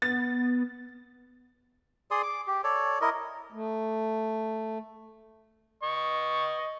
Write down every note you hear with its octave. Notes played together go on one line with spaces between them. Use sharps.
B3 A6
G#4 D5 C6 D#6
D6
G4
A4 C#5 D5
E4 A#4 D#5
A3
D#5 C#6